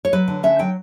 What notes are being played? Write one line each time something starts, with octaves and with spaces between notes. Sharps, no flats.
C#5
F#3 B4
D3
C#4 E5
F#3 G5